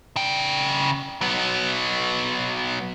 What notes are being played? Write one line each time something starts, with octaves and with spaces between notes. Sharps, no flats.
C#3 G5
F#3 B3